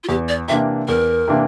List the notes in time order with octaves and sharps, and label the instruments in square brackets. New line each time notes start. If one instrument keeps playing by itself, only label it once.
[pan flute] F4
[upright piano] E2 [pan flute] G4
[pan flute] D5
[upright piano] C3 E3 A#3 D4 [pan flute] E5
[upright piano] E2 [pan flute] A#4
[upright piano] C3 E3 A#3 D4